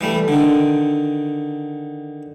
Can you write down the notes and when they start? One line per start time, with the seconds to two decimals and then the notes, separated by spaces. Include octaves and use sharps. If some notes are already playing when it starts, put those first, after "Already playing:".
0.01 E3 G3 A3
0.28 D3 D#3